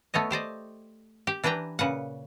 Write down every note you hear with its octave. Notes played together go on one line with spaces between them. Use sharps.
A3 B3 C#5 D#5
G4 C5 D5 D#5
G4
E3 D4 B4 G5 A#5
A#2 C#3 B4 F#5